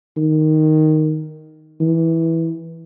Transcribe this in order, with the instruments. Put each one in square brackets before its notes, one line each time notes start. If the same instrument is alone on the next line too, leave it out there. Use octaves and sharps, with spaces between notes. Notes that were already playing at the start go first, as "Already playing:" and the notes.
[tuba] D#3
E3